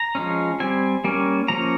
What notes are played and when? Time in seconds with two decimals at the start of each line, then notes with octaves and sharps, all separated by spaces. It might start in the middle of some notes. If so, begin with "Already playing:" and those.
Already playing: A#5
0.15 F3 G#3 C#4
0.60 G3 C4 G#5
1.04 G3 A#3 C#4
1.48 F3 A#3 C#4 A#5